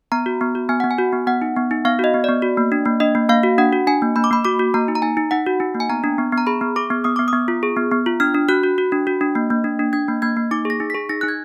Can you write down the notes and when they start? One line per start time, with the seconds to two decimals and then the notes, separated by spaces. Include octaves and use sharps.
0.12 B3 A#5
0.26 F#4
0.41 B3
0.55 F#4
0.69 B3 G#5
0.80 B3 F#5
0.91 G#5
0.99 F#4
1.13 B3
1.27 B3 F#5
1.42 D#4
1.56 B3
1.71 D#4
1.85 B3 F5
1.99 F#4 D#5
2.14 B3
2.24 B3 D5
2.42 F#4
2.57 A#3
2.72 D4
2.85 A#3
3.00 D4 D#5
3.15 A#3
3.29 A#3 F5
3.43 F#4
3.58 D4 F#5
3.73 F#4
3.87 D4 G#5
4.02 A#3
4.16 A#3 B5
4.24 D6
4.31 A#3 B5
4.45 F#4 D6
4.59 F#4
4.74 A#3 A#5
4.88 D#4
4.95 A#5
5.02 D#4 G#5
5.17 D#4
5.31 D#4 F#5
5.46 F#4
5.60 D#4
5.75 A#3
5.80 G#5
5.89 B3 A#5
6.04 D4
6.18 B3
6.32 B3
6.38 A#5
6.47 G#4 B5
6.61 B3
6.76 G#4 D6
6.90 B3
7.04 B3 D#6
7.16 B3 D6
7.28 D#6
7.33 B3
7.48 F4
7.63 G#4
7.76 B3
7.91 B3
8.06 F4
8.20 D4 F6
8.34 D4
8.49 F#4 F#6
8.63 F#4
8.78 F#4
8.92 D4
9.07 F#4
9.21 D4
9.35 A#3
9.50 A#3
9.64 D4
9.79 D4
9.93 D4 G#6
10.08 A#3
10.22 A#3 G#6
10.37 A#3
10.51 D#4 D6
10.65 G#4 A#6
10.80 D#4
10.90 G#4 B6
11.09 D#4 A#6
11.21 D#4 F#6
11.28 G#6